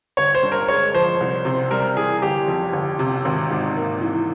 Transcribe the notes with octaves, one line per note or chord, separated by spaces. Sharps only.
G1 C#5
C5
G2
A#4
G#3 C#5
F3 C5
C2
C3
G3 A#4
E3 G#4
G1 G4
F2
G1
C3
G#1
G#2
A#3
E3